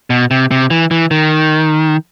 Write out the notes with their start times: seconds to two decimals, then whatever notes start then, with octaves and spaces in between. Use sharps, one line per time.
0.10 B2
0.31 C3
0.51 C3
0.70 E3
0.91 E3
1.11 D#3